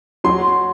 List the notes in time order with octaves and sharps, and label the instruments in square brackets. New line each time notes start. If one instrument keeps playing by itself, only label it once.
[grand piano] F#3 C6